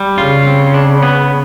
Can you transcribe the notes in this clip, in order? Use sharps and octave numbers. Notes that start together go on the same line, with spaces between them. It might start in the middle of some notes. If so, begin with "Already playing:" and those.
Already playing: G3
C#3 F4
C4
D4
B3